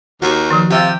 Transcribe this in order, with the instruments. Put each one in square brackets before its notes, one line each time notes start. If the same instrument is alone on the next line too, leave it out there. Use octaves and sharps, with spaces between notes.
[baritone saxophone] D#2 [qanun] F#4 C#6
[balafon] D#3 F3
[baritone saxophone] C3 [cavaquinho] F4 E5 G5 [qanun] G4